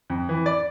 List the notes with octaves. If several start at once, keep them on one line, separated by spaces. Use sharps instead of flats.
F2
E3
D5